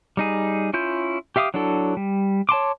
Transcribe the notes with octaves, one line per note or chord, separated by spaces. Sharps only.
G3 D#4 G#4
C#4 E4 F4 G6
G4 E5 F5 D6 D#6
F#3 D4 E4 F#4 A4
G3
C#5 A5 C6 D6